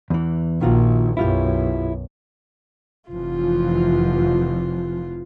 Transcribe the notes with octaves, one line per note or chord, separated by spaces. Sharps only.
E2 E3
A#1 D#3 F4 F#4
B1 F#2 E4 F4 G4
F1 E3 F3 F4